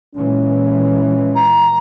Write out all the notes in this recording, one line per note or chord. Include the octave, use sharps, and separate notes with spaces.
A#2 E3 G#3 C#4
A#5